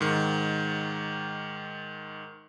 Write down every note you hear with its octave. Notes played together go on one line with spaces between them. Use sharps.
G#2 D#3